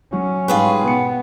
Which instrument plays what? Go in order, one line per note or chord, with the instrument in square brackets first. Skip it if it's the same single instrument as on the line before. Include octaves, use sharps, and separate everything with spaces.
[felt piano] F#3 F#4 [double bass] C#4
[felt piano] G#2 G3 G#3 [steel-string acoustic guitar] F4 G#4 B4 [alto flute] G5
[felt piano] B2 C#7 [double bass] B3